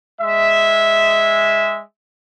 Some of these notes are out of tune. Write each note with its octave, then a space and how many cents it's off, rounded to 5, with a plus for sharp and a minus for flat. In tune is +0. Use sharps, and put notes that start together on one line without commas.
G#3 -10 E5 -10